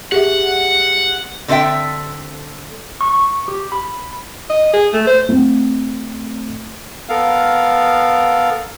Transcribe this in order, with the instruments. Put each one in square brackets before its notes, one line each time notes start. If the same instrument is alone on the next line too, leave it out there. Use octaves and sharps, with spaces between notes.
[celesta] G4 G#4 E5 [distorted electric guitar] F#5
[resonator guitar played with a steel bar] D3 C4 A4 D5 E5 G5
[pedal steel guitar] C#6
G4
B5
[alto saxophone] D#5
G#4
A3
C5
[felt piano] A3 C4
[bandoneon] B3 A4 A#4 F5